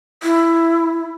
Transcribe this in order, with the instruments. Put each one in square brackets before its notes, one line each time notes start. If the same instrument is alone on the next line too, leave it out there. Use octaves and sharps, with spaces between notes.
[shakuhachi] E4